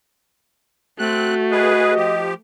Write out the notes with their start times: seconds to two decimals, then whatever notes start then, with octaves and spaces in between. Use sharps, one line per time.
0.99 A3 C4 F#4 F#6
1.51 G#4 B4 D#5
1.96 F3 G4